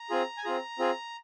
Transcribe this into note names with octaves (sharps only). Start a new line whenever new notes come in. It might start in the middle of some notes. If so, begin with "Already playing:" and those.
Already playing: A#5
C4 F4 G#4
G#5
C4 F4 G#4 A#5
C4 F4 G#4